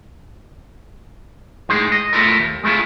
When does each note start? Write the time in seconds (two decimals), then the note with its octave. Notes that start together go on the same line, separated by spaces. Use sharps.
1.69 A2 G#3 D#4 G#4
1.92 D#5
2.13 A3 E4 F4 A4 A#4
2.39 D#2
2.64 G#3 A3 E4 F4 G#4